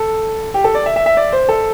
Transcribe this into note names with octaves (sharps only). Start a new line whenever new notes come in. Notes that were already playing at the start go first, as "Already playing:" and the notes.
Already playing: A4
G4
A4
D5
E5
E5
E5
D5
C5
A4